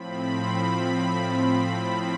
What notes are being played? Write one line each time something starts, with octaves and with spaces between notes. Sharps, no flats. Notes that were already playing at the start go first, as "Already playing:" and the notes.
Already playing: A2 F3 C4 B5